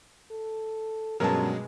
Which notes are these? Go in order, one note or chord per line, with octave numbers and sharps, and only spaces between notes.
A4
G2 B2 F#3 G#3 C#4 G#4 A#4 A5